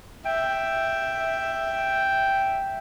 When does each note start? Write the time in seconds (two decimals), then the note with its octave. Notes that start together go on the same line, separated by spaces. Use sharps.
0.25 E5 G5